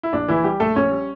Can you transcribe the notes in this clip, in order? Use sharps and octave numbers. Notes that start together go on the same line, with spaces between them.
E4
A#1 D4
A#1 E3 E4
G3 G4
A#1 A3 A4
A#1 C#4 C#5
G3